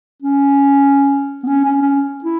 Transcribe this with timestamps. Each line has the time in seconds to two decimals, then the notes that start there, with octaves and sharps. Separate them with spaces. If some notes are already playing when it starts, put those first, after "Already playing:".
0.22 C#4
1.43 B3
1.47 C#4
1.64 C#4
1.82 C#4
2.24 E4